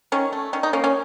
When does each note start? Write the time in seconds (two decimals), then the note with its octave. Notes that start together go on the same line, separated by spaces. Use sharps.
0.12 D#3 C#4
0.32 A3
0.53 D#3 C#4
0.63 D#4
0.73 A#3 C#4
0.84 C#4